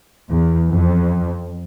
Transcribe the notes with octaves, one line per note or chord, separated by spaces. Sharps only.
E2
F2